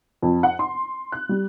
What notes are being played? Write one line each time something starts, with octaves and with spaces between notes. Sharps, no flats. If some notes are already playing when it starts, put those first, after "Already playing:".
F2
F#5
C6
F#6
G3